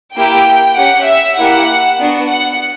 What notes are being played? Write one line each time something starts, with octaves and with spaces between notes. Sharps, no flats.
A#3 E4 G4 G5
C#4 G4 F#5
E5
A#3 E4 G4 F#5
B3 D4 F#4
F#5